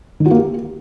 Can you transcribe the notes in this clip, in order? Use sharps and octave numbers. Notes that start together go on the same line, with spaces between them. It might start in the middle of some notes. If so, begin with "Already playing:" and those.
D#3
F#4
A#3
G4